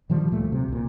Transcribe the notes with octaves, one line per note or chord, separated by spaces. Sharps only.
A#2 D#3 F3 G3
D2 A#2 A3
C3 F#3
C2 A#2